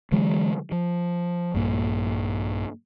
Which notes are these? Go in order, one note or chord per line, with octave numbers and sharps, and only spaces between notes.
D3 E3 F#3 G#3
F3
A#1 G2 A#3